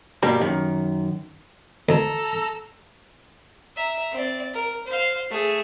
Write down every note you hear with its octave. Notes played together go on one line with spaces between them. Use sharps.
G2 B2 G3 A#3 G4 A#5
F#2 D#3
D2 A4 A#5 E6
E5 A#5
C4 D5
A#4
C5 F5
A3 G#4